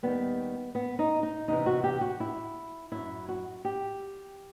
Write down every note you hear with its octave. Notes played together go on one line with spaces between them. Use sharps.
D#2 D#3 G3 B3
B3
D#4
D#4
E2 C3 E3 D#4
F#4
G4
F#4
E4
F#2 F#3 E4
F#4
G4